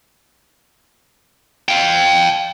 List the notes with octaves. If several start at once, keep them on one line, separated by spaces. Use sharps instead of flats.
F5 G5